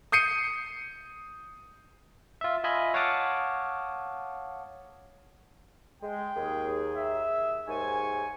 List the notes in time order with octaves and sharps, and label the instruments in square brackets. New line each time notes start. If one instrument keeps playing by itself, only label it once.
[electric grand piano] D#6 G6 C7 C#7 D#7
[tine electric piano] F4 E5
F4 D#5 E5 G#5 B5
C#5 F5 F#5 A5 D6 D#6
[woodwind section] G#3 [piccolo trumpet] G5
[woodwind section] D#2 G#4
[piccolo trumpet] E5
[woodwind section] D#2 G#2 G#5 [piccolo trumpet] C#6